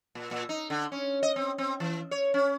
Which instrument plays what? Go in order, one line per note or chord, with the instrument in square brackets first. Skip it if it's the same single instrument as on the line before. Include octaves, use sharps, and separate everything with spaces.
[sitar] A#2
A#2
D#4
D3
C#4
D#5
C4
C4
E3
C#5
C#4